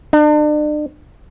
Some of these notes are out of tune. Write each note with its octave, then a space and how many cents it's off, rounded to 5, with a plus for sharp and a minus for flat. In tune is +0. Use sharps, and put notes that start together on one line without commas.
D4 +40